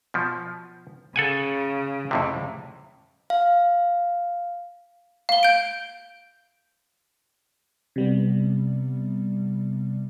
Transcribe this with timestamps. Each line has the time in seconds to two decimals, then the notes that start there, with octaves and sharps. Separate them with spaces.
0.14 B2 F3
1.16 C#3 A4 F#5 G#5
2.11 F2 A2 C3
3.30 F5
5.29 F5 G7
5.43 G6 D7
7.96 C3 G3 B3